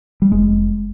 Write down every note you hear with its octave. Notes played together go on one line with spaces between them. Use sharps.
G3
F1 G#3